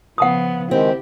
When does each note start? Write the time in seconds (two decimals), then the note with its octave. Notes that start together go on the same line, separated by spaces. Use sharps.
0.18 C#3 F3 B3 F#5 A5 D#6
0.71 D#3 G#3 C4 E4 G4